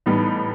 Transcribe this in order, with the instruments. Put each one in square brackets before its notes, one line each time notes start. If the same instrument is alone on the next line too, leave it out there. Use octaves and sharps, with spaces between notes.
[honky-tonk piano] A2 E3 G3 B3 D#4